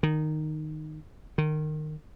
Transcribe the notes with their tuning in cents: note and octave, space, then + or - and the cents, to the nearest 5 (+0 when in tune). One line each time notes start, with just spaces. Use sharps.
D#3 -10
D#3 -25